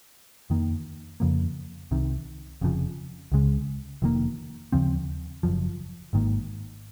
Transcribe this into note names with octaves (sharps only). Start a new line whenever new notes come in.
F2 D#3 A#3
F2 C#3 F3 A#3
C2 C3 D#3
F1 F2 C#3 F3
C#2 C#3 G#3
F1 F2 D#3 A#3
D#2 C#3 F3 C4
F#1 F#2 F3
G#1 G#2 D#3 A#3